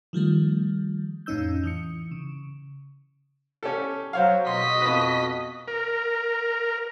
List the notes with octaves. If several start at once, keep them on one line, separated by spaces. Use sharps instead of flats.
D#3 F3 G3 A3
F2 A2 C#4 D#4 E6 G6
E3 D#6 C#7
C#3
C#4 G4 A4
F#3 C5 C#5 F5
B2 D#5 C6 B6
F2 B4
A#4